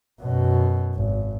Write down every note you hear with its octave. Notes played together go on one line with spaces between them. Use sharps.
F#2 B2
G#1